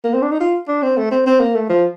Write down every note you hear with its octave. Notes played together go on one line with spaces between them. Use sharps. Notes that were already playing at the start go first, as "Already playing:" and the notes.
A#3
C4
D4
D#4
F4
D4
C4
A3
C4
C4
A#3
A3
F3